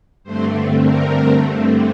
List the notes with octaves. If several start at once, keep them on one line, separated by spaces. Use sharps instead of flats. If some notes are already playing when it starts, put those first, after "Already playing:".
G2 D3 A3 C4 C5
A#4